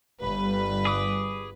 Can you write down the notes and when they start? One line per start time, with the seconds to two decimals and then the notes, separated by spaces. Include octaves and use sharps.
0.21 G1 G3 B4
0.85 G#4 D6 D#6